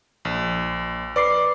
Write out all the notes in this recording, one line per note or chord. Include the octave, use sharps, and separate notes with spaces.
A#1
B4 D5 D6 C7